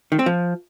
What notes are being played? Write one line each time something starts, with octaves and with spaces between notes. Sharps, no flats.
D#3
C4
F3